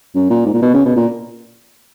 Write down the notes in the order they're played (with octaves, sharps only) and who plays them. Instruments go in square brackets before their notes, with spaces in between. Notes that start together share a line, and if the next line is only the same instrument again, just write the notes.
[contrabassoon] F#2
A#2
G#2
A#2
B2
C#3
B2
A#2